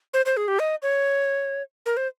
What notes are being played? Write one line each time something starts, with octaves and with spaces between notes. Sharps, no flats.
C5
C5
G#4
G4
D#5
C#5
A#4
C5